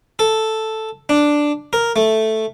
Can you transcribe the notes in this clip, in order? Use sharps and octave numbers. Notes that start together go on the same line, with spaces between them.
A4
D4
A#4
A3